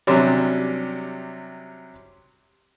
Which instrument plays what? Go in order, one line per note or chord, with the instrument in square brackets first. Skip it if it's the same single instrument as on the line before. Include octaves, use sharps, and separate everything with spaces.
[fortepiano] C3 F#3 G3 C#4 D4